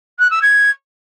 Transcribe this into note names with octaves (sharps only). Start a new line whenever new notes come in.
F#6
E6
G#6